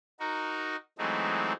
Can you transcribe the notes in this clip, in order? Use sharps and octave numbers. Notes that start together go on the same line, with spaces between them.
D#4 F#4 A#4
E3 F#3 G#3 A3 C4 D#4